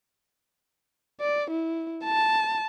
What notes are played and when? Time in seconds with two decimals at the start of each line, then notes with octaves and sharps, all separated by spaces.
1.21 D5
1.51 E4
2.05 A5